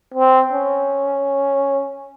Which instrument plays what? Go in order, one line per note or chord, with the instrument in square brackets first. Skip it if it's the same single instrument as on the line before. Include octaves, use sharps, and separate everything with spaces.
[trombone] C4
C#4